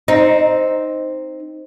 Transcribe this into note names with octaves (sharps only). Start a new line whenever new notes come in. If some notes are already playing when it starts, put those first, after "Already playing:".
C4 D#4